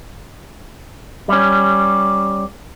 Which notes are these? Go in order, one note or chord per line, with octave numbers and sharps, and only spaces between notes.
G3 C#4